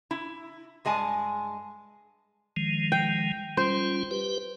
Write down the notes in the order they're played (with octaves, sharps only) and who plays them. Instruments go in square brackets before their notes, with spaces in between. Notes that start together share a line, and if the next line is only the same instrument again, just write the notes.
[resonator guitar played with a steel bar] E4
G2 G#3 G#5 A5
[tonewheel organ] D#3 F3 G#3
[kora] G5
[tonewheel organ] G3 C#4 F4 [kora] C5
[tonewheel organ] G4 B4